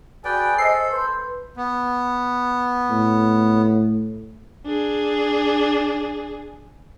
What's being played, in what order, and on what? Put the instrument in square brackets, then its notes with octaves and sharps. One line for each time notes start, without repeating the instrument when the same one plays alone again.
[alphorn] F#4 [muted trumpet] G#4 [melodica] B4 D5 G5
[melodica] A4 [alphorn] C5 [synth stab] D#5 C7
[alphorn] B4 [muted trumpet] C5
[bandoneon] B3
[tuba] A2
[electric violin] D4 G#4